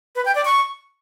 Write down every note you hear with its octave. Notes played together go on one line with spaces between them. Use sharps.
B4
G5
D5
C#6